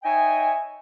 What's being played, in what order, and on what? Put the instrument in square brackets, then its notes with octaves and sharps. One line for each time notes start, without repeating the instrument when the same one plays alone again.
[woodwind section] D#4 C#5 D#5 E5 G5 G#5